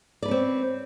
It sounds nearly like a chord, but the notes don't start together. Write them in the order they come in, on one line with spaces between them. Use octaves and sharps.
D5 B4 C#4 C4